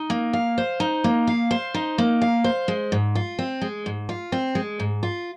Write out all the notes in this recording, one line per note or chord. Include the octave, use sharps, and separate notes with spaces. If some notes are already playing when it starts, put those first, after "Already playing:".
Already playing: D#4
A#3
F5
C5
D#4
A#3
F5
C5
D#4
A#3
F5
C5
G#3
G#2
F4
C4
G#3
G#2
F4
C4
G#3
G#2
F4